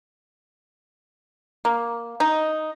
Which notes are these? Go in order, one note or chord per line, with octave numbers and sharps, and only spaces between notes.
A#3
D#4